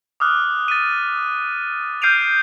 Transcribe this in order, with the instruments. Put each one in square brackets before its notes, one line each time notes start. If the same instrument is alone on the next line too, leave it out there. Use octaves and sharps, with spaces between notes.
[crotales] D6 D#6 F6 F#6
A6 B6 D#7
F6 G6 C7 D7 D#7 F7